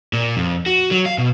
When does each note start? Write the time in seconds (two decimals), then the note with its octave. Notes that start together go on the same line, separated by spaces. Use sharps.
0.13 A#2
0.37 F2
0.66 F#4
0.91 F#3
1.06 F5
1.18 B2